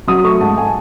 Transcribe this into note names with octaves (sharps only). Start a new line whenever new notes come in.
F#3 D#6
A3 C#6
G#2 A5
G#5